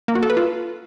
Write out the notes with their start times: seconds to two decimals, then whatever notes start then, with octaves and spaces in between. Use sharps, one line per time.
0.08 A#3
0.15 F#4
0.23 A4
0.30 B4
0.37 F4